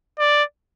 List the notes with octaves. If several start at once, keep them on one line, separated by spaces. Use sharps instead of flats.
D5